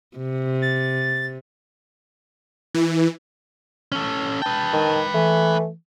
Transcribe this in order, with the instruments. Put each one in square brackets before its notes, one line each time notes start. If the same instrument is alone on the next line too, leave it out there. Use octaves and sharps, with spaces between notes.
[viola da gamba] C3
[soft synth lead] A6
[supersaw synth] E3
[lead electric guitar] C#4 A4
[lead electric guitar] B4 G5 [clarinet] A5
[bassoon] D#3
[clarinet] E3 [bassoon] A3